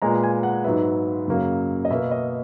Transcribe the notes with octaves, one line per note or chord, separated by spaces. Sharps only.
A#2 G#3 B3 A#5
G#5
F#5
G#2 F#3 B3 E5
F#2 C#3 F#3 A#3
D#5
B2 A#3 E5
D#5